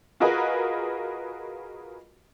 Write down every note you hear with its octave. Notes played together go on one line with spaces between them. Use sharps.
F4 F#4 G#4 A#4 B4 D#5